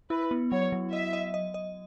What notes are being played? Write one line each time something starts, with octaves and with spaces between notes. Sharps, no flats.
E4 B4
B3
F#3 C#5
F#3
D#5 E5
D#5
D#5
D#5